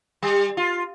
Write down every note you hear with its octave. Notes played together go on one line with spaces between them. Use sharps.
G3
F4